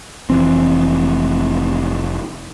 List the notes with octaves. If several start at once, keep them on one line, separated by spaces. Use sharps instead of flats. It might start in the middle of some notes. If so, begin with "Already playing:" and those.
F1 E3 C4